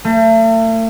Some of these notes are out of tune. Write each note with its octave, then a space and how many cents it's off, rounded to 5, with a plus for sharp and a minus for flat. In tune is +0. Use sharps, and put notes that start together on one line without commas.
A3 +40